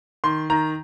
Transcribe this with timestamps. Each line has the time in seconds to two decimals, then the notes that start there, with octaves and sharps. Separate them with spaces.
0.24 D#3 C6
0.50 D#3 A#5